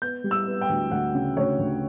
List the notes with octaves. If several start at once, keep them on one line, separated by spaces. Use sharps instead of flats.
B3 G6
G3
E6
B3
G5
D2
D2 F#5
C#3
D2 C#5
D2